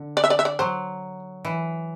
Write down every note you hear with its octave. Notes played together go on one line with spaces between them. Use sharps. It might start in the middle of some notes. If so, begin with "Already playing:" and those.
Already playing: D3
D5
E5
D5
E5
D5
F#3 C5
E3